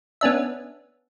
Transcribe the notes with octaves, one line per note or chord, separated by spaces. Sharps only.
B3 C#4 D4 E5